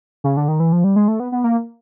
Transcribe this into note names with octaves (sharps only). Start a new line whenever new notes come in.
C#3
D3
D#3
E3
F3
G3
G#3
A3
B3
B3
A#3